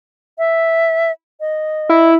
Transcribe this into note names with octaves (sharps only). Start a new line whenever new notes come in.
E5
D#5
E4